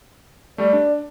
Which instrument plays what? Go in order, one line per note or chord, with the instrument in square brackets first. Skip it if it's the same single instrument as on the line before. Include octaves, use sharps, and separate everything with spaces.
[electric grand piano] G3 A3 [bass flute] D5
[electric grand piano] D4